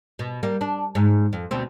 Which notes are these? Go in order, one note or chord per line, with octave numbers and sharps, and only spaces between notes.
B2
G3 A#3
D4
G#2
F2
D2 B2 C4